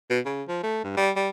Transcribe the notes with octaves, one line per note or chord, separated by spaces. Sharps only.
B2
C#3
F3
A3
G2
G3
G3